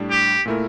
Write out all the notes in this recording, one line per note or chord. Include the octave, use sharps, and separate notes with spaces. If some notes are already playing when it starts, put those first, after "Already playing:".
Already playing: A2 G3 D4
G4
A#2 A3 E4 A#4